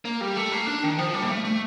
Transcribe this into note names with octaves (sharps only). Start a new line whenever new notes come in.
A#3
G3
A3
A#3
D4
D#3
F3
G3
A#3
A3
A3